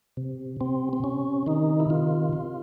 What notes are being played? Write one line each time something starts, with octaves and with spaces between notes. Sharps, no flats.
C3
C3 C4
C4
C3 C#4
D#3 D#4
E4
C3 F4
C3